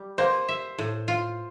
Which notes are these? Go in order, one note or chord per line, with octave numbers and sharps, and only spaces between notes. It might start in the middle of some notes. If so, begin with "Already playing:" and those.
Already playing: G3
A#3 C5
E5
A2
F4